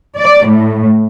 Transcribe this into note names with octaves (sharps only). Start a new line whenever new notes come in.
D5
A2